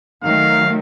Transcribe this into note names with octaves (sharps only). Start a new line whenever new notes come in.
D#3 F#3 A3 F5